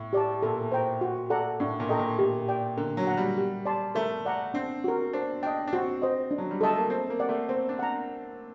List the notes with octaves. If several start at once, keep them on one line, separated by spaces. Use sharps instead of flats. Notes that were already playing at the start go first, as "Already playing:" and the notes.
Already playing: A2
G4 D5 A5
A#2 A4
C5 G5 A#5
F#4
A4 D5 F#5 A#5
A2 D4
A#2
A4 D#5 G5 A#5
A#2
A#2 G4
D5 G5
D3 A#4
F#3
F#5 A#5
G3
G4
D5 A5 C6
A3 A#4
D5 F#5 A#5
C4 D4
F#4 A#4
D4 C5
D4 D#5 G5
D4
C4 F#4
C5 D#5
D4
F#3
G3
A3 A4 D#5 A5
A#3
C4 A#4
A#3
D5 F#5
A3
C4 C5
D4
F#5 A#5